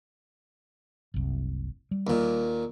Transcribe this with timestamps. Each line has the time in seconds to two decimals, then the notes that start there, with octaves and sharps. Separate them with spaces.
1.14 F#1 C2
1.91 G3
2.07 D#2 A#2